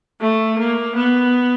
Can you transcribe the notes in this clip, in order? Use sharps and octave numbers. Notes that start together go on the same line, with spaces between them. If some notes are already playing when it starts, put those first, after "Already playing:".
A3
A#3
B3